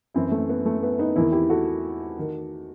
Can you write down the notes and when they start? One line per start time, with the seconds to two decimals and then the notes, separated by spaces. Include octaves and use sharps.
0.14 F#2 E3 C4 E4
0.32 A3
0.49 B3
0.66 A3
0.83 B3
0.99 B3 D#4
1.16 E2 D#3 C4 E4
1.32 E4 G4
1.50 F#4 A4
2.19 D#3